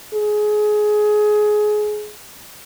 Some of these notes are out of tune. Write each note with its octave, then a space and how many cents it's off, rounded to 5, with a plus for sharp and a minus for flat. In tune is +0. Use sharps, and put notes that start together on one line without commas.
G#4 +20